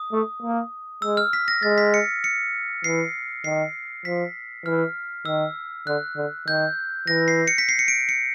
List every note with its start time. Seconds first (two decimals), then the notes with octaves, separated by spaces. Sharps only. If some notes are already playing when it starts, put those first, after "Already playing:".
Already playing: D#6
0.12 A3
0.42 A#3
1.02 G#3 E6
1.17 F6
1.33 B6
1.48 A#6
1.63 G#3 A6
1.78 B6
1.94 C#7
2.24 C#7
2.84 E3 C7
3.44 D#3 C7
4.05 F3 B6
4.66 E3 F6
5.25 D#3 E6
5.87 D3 F#6
6.16 D3
6.47 D#3 G6
7.07 E3 A#6
7.28 C7
7.48 C#7
7.58 B6
7.69 C7
7.79 C#7
7.88 D7
8.09 C#7